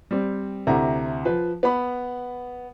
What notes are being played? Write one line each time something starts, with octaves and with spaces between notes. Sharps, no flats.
G3 C4
D2 C3 E4 A#5
F3 B4
B3 B5